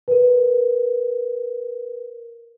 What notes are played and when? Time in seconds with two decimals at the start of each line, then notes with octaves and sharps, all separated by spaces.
0.08 A#4 B4